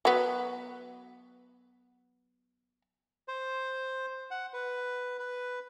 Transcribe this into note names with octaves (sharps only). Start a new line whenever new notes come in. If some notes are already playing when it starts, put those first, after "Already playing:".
F#3 B3
C5
F#5
B4
B4